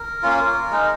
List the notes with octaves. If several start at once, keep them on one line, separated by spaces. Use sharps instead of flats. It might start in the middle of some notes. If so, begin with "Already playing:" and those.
Already playing: A#4
A#3 C#4 F4
G#3 D#4